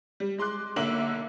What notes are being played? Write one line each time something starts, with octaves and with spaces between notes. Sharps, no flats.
G3
G#3 C6 D6 F#6
B1 D3 A#3 E5 F#7